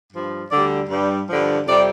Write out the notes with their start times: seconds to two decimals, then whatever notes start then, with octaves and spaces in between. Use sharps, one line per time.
0.12 G2 F3
0.51 D2 D3 G3 D5
0.89 G2 G3
1.29 G2 D3 F3
1.66 F2 C3 G3 D5